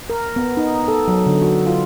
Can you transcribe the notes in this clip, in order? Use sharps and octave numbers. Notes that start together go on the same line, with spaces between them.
A#4
B3
D#4
A4
F#3
D3
F#4
F4